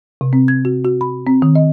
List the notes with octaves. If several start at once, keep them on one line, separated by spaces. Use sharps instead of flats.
C3
C4
G#6
F#4
F#4
B5
C4
D#3
D#5